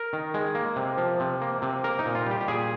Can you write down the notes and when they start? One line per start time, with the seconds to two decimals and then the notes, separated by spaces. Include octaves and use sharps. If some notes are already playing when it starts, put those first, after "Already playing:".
Already playing: A#4
0.13 D#3
0.34 G#3
0.55 A#3
0.76 C3
0.98 F3
1.20 C3
1.41 A#3
1.62 C3
1.84 A#3 A#4
1.99 D#4
2.05 A#2
2.15 F4
2.26 G3 G4
2.41 G4
2.48 A#2 G#4